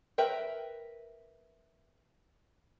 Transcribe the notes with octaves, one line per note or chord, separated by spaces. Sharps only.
A#4 B4 E5 G5